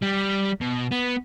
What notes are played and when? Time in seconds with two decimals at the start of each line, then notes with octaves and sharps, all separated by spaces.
0.02 G3
0.61 B2
0.92 B3